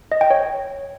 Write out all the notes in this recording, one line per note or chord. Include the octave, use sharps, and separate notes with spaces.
D#5
G5
C#5